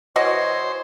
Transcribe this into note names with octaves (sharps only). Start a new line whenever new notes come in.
E3 F#4 C5 C#5 D#5